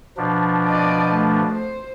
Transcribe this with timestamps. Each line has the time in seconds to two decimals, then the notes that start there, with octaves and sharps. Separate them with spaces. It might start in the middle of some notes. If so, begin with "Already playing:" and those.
0.17 B2 F3 D4
0.66 D5 D#5
1.11 A3
1.51 C5